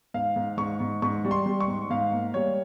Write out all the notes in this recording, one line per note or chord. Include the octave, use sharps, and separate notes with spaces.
G#2 F5
G#2
G#2 C#6
G#2
G#2 C#6
G3
C6
G3
C#6
G#2
G#2 F5
A#3
G3 C#5